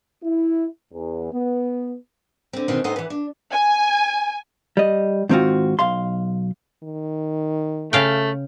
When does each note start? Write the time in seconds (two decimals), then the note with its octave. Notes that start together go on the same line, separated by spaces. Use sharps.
0.24 E4
0.92 E2
1.32 B3
2.53 D3 C4
2.68 B2 D#3 E3 G#3 B3 C4
2.84 A2 B3 D#4 A4 C5 G#5
2.96 E3 B4
3.10 D4
3.53 G#5
4.77 G3 D#5
5.29 G#2 D#3 C4 C#4 F4 F#4
5.79 B1 F5 C6
6.83 D#3
7.93 C#3 A3 F5 G5